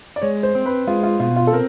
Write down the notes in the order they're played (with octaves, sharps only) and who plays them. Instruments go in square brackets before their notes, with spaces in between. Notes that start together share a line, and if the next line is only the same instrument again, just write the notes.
[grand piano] D5
[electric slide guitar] G#3 [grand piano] C#5
[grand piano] C5
[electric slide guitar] C4
[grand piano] B4
[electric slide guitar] G#3 [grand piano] F4
[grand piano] F4
[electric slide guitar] B2 [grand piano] F4
[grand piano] F4
A4
[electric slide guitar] C4 [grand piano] A#4